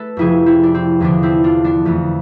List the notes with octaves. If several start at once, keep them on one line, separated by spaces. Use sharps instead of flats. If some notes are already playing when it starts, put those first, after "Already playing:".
Already playing: A3 A4 B4
F2 C3 F3 E4 G#4
C4 E4
D4
C4
E2 D3 F3 B3 D4
C4 E4
D4 F4
B3 D4
F2 E3 A3 B3